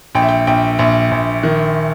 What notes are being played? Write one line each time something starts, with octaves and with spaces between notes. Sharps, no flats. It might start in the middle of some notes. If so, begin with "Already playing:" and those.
A#1 G5
E5
G5
A#1 G5
A#1 E5
A#1
D#3